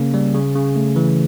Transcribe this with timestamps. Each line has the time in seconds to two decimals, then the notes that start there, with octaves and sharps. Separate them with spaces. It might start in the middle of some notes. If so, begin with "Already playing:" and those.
Already playing: C#3 A#3 C#4
0.14 G3
0.34 C#3
0.55 C#3
0.76 A3
0.96 E3